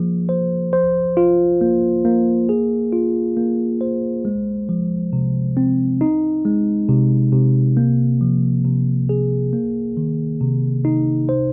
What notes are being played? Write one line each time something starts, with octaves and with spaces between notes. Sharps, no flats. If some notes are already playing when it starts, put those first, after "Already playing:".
Already playing: F3 A#3 G#4
C5
C5
F4
A#3
A#3
G#4
F4
A#3
C5
G#3
F3
C3
C4
D#4
G#3
C3
C3
A#3
F3
C3
G#4
A#3
D#3
C3
D#4
C5